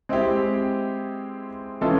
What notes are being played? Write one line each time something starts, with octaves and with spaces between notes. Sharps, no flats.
G#3 C4 E4 G4
E3 G#3 C#4 F4 A4